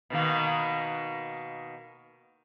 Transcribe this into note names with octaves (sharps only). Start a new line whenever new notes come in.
B2 D#3 A#3